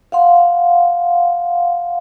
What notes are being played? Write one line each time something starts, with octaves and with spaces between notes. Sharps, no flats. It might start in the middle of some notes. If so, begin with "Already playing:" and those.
F5 F#5 C6